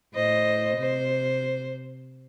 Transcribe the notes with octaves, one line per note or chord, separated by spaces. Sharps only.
A2 C5 D#5
C3 C5